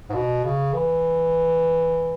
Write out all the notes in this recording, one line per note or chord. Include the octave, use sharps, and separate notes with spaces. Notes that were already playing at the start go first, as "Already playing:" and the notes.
G#2
B2
C#3
E3